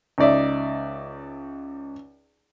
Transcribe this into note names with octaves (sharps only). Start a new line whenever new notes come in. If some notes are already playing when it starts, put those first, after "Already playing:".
C#2 D#4 D5 E5